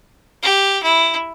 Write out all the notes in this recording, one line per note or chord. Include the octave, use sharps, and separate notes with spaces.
G4
E4